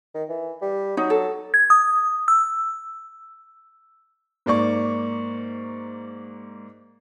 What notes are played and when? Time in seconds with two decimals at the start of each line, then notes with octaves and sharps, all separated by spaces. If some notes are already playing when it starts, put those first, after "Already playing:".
0.14 D#3
0.29 E3
0.61 G3
0.97 F#3 D#4
1.10 A4
1.54 G#6
1.70 D#6
2.28 E6
4.46 G#2 A#3 D5 C#6